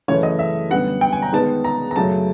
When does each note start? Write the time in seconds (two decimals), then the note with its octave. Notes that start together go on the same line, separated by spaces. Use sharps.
0.08 F#2 C#3 E3 A3 C#4 C#5
0.23 D#5
0.39 E5
0.70 F#2 D3 G3 B3 F#5
1.01 G5
1.12 G#5
1.22 A#5
1.33 D#3 G#3 B3 D#4 A5
1.64 A#5
1.91 A#5
1.96 F#2 C#3 F#3 A3 A5